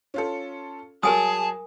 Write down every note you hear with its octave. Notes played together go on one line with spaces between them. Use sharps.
C#4 F4 A4
F#3 G#4 A#4 G#5 A5 D#6